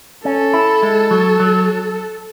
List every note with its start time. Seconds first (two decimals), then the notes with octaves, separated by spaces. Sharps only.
0.25 C#4 A4
0.53 E4
0.83 G#3
1.11 F#3
1.40 F#3